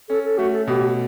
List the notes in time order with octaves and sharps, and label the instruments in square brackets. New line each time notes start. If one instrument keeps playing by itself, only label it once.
[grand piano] C#4 [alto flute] A4
[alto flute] A4
[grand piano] A3 [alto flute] F#4
[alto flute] A4
[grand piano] B2 [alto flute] G4